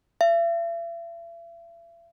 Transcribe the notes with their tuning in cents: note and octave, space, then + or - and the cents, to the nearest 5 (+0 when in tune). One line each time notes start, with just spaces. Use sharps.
E5 +45